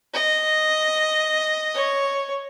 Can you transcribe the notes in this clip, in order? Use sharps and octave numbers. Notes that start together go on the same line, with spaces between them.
D#5
C#5